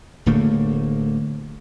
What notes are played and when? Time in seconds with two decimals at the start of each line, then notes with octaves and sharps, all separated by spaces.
0.26 D1 D3 A3 A#3